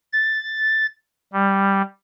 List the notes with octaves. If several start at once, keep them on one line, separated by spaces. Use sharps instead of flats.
A6
G3